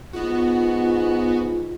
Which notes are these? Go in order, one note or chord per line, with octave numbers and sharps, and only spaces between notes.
G#2 B3 F4 F#4